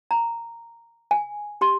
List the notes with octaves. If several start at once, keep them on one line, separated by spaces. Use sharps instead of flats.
A#5
G#5
G4 C6